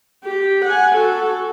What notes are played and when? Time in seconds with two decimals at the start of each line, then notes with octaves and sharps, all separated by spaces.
0.24 G4
0.65 F#5 G#5
0.95 F#4 A4